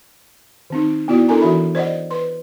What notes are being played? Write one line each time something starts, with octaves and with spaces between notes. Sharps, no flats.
D#3 C4 D#4
B3 E4 F#4 D5
D4 E4 A4 A#4 G#5 A#5
E3 F#4 E5 B5
C5 D5 D#5 F#5
B4 C6